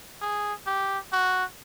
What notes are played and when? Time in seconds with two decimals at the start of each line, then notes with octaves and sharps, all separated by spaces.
0.22 G#4
0.67 G4
1.13 F#4